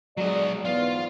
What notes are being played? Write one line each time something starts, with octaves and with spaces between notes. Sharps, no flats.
F#3 G#3 D5 D#5
G#2 E3 B3 F4